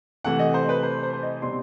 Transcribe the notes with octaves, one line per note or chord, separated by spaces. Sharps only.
C3 E3 A3 F#5
D#5
C5
B4
C5
C5
C5
D#5
B2 G3 C4 D#4 C6